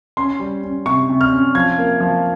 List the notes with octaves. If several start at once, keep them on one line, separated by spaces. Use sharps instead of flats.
C#4 C6
G3
C#4
C3 C#6
C3
F6
C#4
F3 G#6
A#3
F3